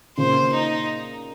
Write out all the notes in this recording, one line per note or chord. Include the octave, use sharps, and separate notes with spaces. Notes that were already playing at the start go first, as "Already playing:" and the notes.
A#2 C#3 C5
D#4